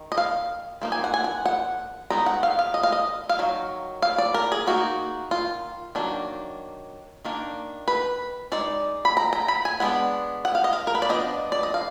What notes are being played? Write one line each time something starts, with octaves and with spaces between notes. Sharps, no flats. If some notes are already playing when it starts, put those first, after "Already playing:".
Already playing: D#3
D#5
F5
F3 A#3 D#4
G#5
F#5
G#5
F#5
F#5
D#3 G#3 B3 D#4 A#5
F#5
F5
F5
D#5
F5
D#5
F5
D#3 F#3
F5
D5
A#4
G#4
D#3 A#3 D#4 F#4
F4
D#3 F#3 A#3 D4
D#3 A#3 D4
B4
G#3 D#4 D5
B5
A#5
A#5
B5
G#5
G#3 B3 D4 F#5
F#5
F5
D#5
F5
A#4
B4
D5
F3 B3 D4 D#5
D5
D#5
F5